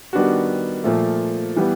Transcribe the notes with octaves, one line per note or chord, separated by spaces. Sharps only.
D#3 G3 B3 D4 F#4
A#2 F3 A3
E3 G3 B3